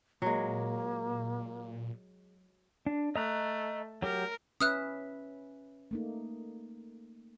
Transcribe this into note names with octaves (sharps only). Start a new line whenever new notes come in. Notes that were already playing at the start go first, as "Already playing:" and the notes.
A#2 F#3 G#3 A#3
D4
A3 D#5 A#5 F#6
F#3 G4 A#4
C#4 B4 E5 D#6 F6 F#6
A3 A#3 D#4